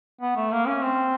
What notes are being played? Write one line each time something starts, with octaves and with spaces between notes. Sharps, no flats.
B3
A3
A#3
C#4
C4